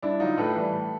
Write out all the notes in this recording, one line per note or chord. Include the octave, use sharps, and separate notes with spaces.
G2 D4 E4
D3 F#3 D#4 F4
A2 A4 B4
E3 G3
A2